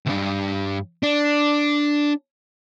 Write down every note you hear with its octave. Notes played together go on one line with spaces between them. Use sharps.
C2 G2
D4